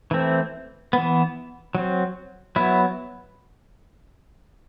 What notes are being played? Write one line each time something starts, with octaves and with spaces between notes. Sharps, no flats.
E3 A3 C4
E3 B3
F#3 C4
F#3 B3 E4